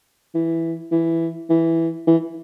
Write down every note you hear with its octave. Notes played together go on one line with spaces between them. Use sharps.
E3
E3
E3
E3